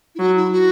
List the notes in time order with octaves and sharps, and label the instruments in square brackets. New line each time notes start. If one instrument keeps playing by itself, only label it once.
[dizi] E4
[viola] F#3 [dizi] F#4
[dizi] E4
F#4